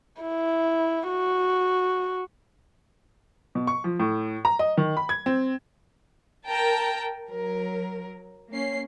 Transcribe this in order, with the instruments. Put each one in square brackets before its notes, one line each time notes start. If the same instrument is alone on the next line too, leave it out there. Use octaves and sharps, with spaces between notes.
[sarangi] E4
F#4
[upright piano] B2
C#6
F3
A2
A#5
D#5
D#3
B5
G#6
C4
[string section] A#4 G5 A5 A#5
F#3 A#4
A#3 C#4 C7